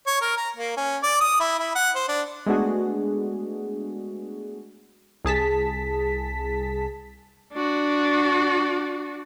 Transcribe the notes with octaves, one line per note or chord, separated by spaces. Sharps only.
C#5
A#4
A#5
A#3
C#4
D5
D#6
E4
E4
F#5
C5
D4
G#3 A3 B3 D4 F#4 G#4
C2 G#4 A5 B6
D4 F#4